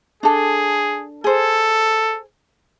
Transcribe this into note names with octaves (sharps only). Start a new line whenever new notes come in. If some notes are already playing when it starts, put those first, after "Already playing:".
D4 G#4 A4
G#4 A4 C5